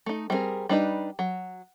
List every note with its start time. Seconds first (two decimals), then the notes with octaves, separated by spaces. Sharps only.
0.06 A3 D#4
0.30 G3 C4 E4 G#4 A#4
0.69 G3 D4 D#4 B4
1.19 F#3